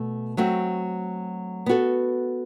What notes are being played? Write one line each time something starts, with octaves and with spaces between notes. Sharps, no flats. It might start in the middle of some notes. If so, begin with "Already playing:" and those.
Already playing: B2 A3
F#3 A3 C4 F#4
B3 F#4 A4